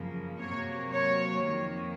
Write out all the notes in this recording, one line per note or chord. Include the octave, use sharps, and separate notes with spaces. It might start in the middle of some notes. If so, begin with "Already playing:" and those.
Already playing: F#2 C#3 F3 A#3
C3 F#3 A#3 C#5
C#5
F2 D#3 A#3